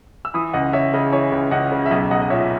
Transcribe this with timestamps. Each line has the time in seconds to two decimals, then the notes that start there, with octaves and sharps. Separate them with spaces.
0.25 E6
0.34 E3 B5 D#6
0.53 C#2 D#5 F#5
0.73 C#2 C#5 E5
0.93 C#3 D#5
1.12 E3 C#5 E5
1.32 C#2
1.51 C#2 D#5 F#5
1.72 C#3
1.86 E5
1.90 B1 D#5
2.11 B1 D#5 F#5
2.22 D#5
2.30 A#2 C#5 E5